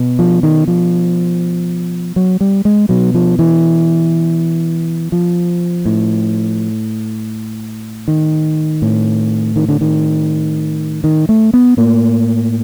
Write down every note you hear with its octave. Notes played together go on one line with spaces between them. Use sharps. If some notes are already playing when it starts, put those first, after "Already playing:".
Already playing: B2
F3
D#3
F3
F#3
G3
G#3
B2 F#3
F3
E3
F3
A2
D#3
A2
D#3
D3
D#3
D#3
A3
B3
A2 A#3